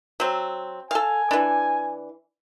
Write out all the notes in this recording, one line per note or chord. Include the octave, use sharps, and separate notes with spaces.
F#3 C4
A4 F5 G#5
E3 D4